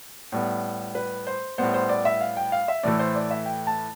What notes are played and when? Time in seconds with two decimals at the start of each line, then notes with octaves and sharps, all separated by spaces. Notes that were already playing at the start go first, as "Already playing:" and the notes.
0.32 A2 G3 B3
0.95 B4
1.27 C5
1.58 A2 G3 B3 C5
1.74 C5
1.89 D5
2.05 E5
2.21 F5
2.37 G5
2.52 F5
2.68 E5
2.83 A2 E3 A3 D5
2.99 C5
3.15 D5
3.31 E5
3.46 G5
3.67 A5